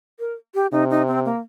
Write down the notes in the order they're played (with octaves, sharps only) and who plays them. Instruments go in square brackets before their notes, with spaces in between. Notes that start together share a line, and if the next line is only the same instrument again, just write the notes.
[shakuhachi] A#4
G4
[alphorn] C3 [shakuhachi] D#4
[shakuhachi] D#4
C4
A#3